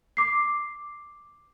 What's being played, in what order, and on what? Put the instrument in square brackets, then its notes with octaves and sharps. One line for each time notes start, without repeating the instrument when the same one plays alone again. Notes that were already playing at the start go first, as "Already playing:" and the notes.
[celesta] D6 C7